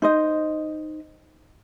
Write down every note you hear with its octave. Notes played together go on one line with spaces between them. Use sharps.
D#4 C5 D#5